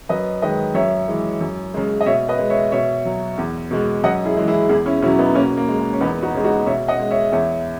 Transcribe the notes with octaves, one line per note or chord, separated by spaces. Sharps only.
F#2 B4 D#5
D#3 G#3 B4 D#5
F#2 C#5 E5
E3 G#3
F#2
C#3 G#3
D#5
B2 C#5 E5
B4 D#5
G#3
C#5 E5
B2 C#5 E5
F#3
E2
B2 G#3
F#2 D#5 F#5
E4 G#4
E3 G#3
E4 G#4
E2 E4 G#4
C#4 E4
B2 F#3 C#4 E4
B3 D#4
B2 A#3 C#4
A#3
G#3
G#3
C#4
E2 B3 D#4
D#4 F#4
C#3 G#3
D#4 F#4
B2 C#5 E5
D#5 F#5
G#3
C#5 E5
E2 C#5 E5